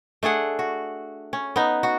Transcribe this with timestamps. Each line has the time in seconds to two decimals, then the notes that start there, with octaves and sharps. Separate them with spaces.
0.23 A3 D4 G#4 F#5
0.59 F#4
1.33 C#4
1.56 B3 D#4
1.83 F#4